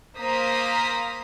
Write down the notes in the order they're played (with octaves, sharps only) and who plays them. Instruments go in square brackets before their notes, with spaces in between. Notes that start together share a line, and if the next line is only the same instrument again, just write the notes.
[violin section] A#3 C5 F5 A#5 D#6 B6